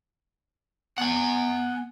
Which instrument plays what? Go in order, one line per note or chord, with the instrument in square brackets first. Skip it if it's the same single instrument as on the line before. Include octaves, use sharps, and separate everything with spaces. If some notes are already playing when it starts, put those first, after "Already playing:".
[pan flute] B3 [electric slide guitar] F#5 G#5